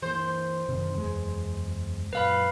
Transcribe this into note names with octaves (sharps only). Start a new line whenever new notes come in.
E3 A#3 C5
F#1 C3 D#3
E2 G#3
F#2 A#2 B4 F5 B5